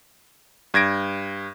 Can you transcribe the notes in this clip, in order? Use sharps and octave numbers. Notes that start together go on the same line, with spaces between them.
G2 G#6 A#6 D7